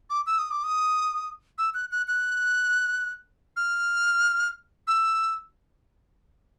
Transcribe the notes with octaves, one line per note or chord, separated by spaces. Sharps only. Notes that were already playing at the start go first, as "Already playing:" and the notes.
D6
E6
D#6
D6
D#6
E6
F#6
F#6
F#6
F6
E6